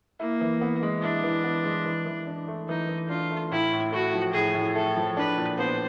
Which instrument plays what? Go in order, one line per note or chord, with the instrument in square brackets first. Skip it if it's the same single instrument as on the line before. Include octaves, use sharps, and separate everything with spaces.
[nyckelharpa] A#3 [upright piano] E4
[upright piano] E3
B3
G#3
[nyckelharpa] D4 [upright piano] E4
[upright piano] E3
B3
G#3
E3
E3
D4
A3
[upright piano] E3 [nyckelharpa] D#4
[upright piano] E3
[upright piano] D4 [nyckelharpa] F4
[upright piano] A3
[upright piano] A2 [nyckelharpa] E4
[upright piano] A2
[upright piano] A3 [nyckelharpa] F#4
[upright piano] F3
[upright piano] A2 [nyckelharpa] G#4
[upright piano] A2
[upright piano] A3 [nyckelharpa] A4
[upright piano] F3
[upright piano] D4 [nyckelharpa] B4
[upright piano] A#2
[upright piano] B3 [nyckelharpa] C5